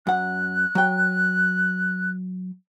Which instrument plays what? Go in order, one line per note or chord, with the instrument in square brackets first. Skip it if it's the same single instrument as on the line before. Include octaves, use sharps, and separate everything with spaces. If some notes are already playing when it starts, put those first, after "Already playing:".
[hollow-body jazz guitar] F#2 F#5 [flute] F#6
[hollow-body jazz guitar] F#3 G5